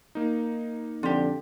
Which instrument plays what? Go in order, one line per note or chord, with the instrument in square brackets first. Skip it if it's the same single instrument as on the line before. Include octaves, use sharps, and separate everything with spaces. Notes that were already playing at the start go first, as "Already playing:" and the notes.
[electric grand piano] A#3 D#4
[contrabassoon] F2 [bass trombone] D3 [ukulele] F4 G4